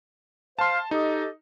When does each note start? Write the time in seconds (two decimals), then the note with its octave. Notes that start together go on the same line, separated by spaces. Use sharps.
0.59 C5 F5 A5 C6
0.91 D#4 G4 A4 D#5